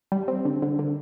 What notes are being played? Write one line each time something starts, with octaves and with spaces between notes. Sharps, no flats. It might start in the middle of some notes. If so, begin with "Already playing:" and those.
G3
C4
D3
D3
D3